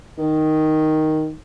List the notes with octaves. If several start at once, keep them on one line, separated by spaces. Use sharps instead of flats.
D#3